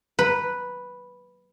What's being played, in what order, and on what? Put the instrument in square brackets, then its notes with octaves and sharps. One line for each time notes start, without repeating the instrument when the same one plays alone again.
[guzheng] B4